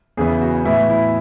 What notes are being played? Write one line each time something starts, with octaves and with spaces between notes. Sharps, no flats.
E2 C#3 E3 B3 G#4
F#4
A2 E3 B3 E4
E4